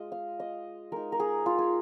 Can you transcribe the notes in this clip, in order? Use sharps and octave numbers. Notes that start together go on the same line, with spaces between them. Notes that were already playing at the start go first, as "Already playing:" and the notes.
Already playing: G#3 F4 D#5
F5
D#5
G#3 D#4 A#4
A#4
G#4
F4
G#4